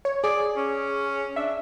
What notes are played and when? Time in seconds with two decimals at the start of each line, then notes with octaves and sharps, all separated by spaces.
0.05 C#5
0.24 G#4 D5
0.57 C#4
1.36 D4 E5